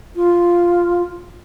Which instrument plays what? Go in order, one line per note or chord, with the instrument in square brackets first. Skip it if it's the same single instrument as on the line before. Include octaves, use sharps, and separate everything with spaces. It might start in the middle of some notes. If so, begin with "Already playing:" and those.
[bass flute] F4